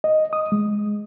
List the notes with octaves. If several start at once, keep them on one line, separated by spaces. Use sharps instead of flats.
D#5
D#6
G#3